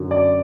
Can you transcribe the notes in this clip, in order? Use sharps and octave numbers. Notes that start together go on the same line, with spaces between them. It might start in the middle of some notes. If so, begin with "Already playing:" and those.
Already playing: F#2 D3 F#3
D5